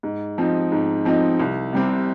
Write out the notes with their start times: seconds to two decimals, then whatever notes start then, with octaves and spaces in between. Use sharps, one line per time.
0.03 G#2
0.38 F3 C4 D#4
0.72 G#2
1.05 F3 C4 D#4
1.39 C2
1.73 C3 G3 C4